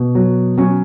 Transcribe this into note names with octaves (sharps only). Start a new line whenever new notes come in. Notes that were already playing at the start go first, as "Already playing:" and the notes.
Already playing: B2
F#3
F#3 C#4